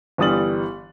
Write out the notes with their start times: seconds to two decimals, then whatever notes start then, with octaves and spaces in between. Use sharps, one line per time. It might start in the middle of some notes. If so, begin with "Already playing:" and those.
0.18 G1 E3 G3 D#6 A6 F#7